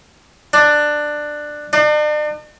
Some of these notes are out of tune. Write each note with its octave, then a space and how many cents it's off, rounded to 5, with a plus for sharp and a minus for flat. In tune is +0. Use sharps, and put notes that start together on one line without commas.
D4 +15
D4 +45